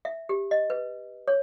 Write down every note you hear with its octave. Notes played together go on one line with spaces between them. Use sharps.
E5
G4
D#5
B4
C#5